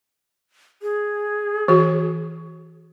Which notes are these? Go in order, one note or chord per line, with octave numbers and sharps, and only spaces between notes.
G#4
E3 F#4